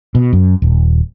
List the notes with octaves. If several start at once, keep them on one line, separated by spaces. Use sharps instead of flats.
B2
F#2
D#1